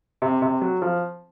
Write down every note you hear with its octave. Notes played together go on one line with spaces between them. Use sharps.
C3
C3
F#3
F3